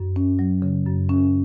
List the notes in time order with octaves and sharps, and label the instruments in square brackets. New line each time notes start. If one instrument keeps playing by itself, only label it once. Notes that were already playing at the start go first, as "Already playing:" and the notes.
Already playing: [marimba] F#2
C#4
F#3
C#3
F#2
C#4